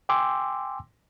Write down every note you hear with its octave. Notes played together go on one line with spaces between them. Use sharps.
G5 G#5 C6 D6 E6